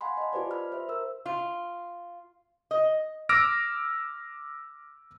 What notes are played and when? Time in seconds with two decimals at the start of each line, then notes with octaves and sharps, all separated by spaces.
0.01 F5 F#5 G#5 B5 C6
0.17 D#5 A5
0.33 F4 G4 B4 C5 D5
0.51 B5 F6
0.72 C5 E5
0.89 A#4 E6
1.26 F4
2.71 D#5
3.29 D6 E6 F6 A#6 D7